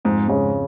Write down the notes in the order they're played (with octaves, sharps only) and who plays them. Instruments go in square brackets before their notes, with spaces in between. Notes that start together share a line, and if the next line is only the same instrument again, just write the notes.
[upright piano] F2 [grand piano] G#2
[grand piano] G#2 [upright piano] C#3